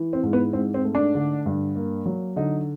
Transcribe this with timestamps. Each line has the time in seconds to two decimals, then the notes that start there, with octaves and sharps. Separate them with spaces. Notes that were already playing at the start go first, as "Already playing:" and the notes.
Already playing: E3
0.13 C4
0.23 G#2
0.33 B3
0.53 G#2 C4
0.74 C4
0.84 A3
0.95 D4
1.15 D3
1.46 G2
1.76 A#3
2.06 F#3
2.36 D3 D#4